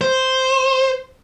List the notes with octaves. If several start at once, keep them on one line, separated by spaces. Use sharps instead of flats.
C5